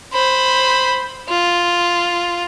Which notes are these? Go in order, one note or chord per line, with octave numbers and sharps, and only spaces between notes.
C5 B5
F4